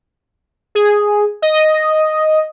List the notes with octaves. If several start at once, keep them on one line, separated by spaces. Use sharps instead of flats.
G#4
D#5